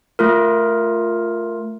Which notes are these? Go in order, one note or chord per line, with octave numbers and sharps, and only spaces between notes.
A3 F4 A#4